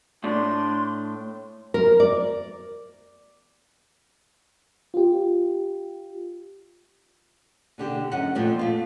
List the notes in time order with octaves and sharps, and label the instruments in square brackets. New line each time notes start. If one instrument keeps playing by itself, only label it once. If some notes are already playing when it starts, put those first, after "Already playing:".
[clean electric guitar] A2 [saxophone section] D4 [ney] C6
[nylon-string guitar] A#4
D5
[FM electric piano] F4 G4
[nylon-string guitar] B2 D3 G4
F#2 D#5 F#5
F2 A#2 F3 A3 C4
A3 F5